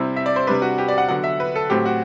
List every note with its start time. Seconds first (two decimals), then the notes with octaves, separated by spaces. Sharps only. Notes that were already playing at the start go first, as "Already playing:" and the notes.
Already playing: C3 G3 C4 E4
0.17 E5
0.26 D5
0.36 C5
0.47 C3 G3 D4 B4
0.62 F#4
0.78 G4
0.88 D5
0.98 F#5
1.09 D3 F#3 B3 F#5
1.24 E5
1.40 B4
1.55 A4
1.70 A2 F#3 C4 G4
1.85 F#4